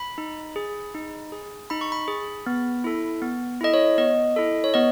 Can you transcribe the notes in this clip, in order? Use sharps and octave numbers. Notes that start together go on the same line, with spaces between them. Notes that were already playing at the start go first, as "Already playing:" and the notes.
Already playing: B5
D#4
G#4
D#4
G#4
D#4 B5
C#6
B5
G#4
B3
E4 A4
B3
E4 A4 D#5
C#5
B3 D#5
E4 A4
C#5
B3 D#5